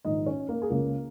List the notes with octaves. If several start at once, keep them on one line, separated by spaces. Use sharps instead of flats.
A#1 G#2 D#3 D#4 D#5
C#4 C#5
A#3 A#4
G#4
C#2 C#3 A#3 A#4